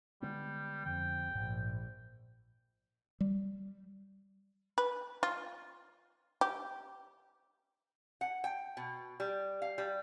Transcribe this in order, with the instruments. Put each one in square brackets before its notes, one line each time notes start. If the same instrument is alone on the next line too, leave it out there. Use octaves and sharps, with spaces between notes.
[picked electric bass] D3 G#3 B3 [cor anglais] G3
[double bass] F2 [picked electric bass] D3 [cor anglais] G5
[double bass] A#1 [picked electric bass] G#2
[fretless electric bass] G3
[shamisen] B4
F4
G4
[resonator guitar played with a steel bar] F#5
G5
B2
G3
F5
G3